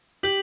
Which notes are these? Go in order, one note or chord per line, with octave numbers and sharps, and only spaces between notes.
G4 G6 B6 F#7